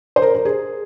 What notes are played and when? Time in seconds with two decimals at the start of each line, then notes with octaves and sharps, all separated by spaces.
0.16 C5
0.22 A#4
0.35 A#4
0.45 G#4